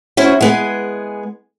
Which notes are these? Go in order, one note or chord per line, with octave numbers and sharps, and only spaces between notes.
C#4 E4 F#4 C5
G#3 B3 G#4